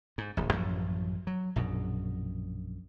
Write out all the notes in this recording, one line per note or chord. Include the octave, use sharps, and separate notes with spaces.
G#2
D1 A#1
A1 F#2 F3 F#3
F#3
A#1 F#2 B2